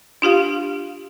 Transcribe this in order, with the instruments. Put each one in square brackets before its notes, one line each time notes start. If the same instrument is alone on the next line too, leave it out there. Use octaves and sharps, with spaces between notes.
[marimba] D4 F4 G4 F5